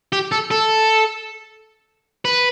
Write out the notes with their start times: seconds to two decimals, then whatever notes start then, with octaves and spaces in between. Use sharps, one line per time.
0.12 G4
0.32 A4
0.51 A4
2.25 B4